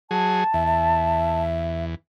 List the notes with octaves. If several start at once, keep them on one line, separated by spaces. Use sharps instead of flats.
F#3 G#4 A5
E2 E5
E5